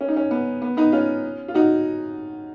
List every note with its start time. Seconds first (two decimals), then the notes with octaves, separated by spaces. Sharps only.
0.01 C#4
0.08 D#4
0.16 C#4
0.31 B3
0.62 B3
0.77 B3 D#4
0.92 C#4 F4
1.48 F4
1.54 D#4 F#4